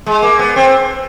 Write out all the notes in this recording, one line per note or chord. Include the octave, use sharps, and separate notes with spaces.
G#3
A#3
B3
C4